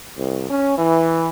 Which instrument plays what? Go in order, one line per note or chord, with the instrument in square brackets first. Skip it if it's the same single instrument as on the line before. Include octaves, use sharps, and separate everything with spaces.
[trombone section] C2
C#4
E3